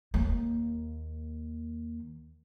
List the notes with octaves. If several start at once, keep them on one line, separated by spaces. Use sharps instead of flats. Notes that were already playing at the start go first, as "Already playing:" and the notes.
D#2 A#3